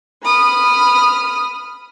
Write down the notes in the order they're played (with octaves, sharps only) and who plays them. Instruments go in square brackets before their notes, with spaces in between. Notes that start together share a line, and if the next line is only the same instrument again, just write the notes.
[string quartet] B5 D#6 F6